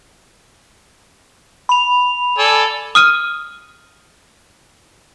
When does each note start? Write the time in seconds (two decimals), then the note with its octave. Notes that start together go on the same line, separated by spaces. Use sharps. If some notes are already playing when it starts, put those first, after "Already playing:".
1.69 B5 F7
2.38 A4 D5 G#5
2.95 D#6 F6 D#7